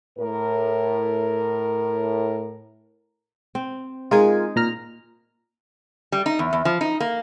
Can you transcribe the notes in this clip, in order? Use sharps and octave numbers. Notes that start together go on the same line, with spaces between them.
A2 A#4
C4
G#3 D#4 F4 G#4 A#4 G#5
A#2 A#5 F6
G3
D#4
E2
E2
F3
D#4
A#3